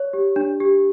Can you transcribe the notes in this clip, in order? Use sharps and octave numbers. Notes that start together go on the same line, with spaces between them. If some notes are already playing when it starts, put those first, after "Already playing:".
Already playing: C#5
G4
D4
G4